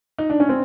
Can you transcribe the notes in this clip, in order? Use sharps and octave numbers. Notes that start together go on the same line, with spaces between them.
D#4
D4
C#4
C4